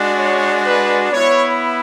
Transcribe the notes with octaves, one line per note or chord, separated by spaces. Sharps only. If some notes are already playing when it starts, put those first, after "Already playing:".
Already playing: G#3 D4 F#4
C#5
B4
B3 E4 C#5